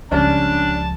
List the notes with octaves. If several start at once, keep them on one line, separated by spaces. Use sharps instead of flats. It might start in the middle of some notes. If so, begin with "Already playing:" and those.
C#2 F3 G3 C#4 D4 A5